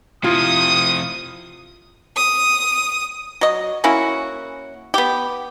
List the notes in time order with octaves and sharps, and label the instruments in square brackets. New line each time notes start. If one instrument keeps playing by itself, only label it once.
[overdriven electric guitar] C3 F3 [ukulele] E4 F4 F5 [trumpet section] D#6
[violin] D#6
[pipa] F#3 D#5
A#3 C#4 E4 F#4
B3 G4